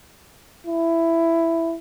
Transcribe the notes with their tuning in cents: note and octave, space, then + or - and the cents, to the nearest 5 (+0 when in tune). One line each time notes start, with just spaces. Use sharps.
E4 +10